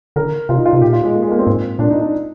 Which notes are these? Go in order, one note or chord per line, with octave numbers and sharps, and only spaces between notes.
D3 A#4
C3 F4
D#4
F4
C3
A#2 G4
F4
G#3
A#3
G#3
A#3
C4
G#2
A#2 D4
D#4
D4